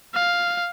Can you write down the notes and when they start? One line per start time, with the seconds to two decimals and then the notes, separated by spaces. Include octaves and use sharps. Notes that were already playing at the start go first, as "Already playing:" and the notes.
0.15 F5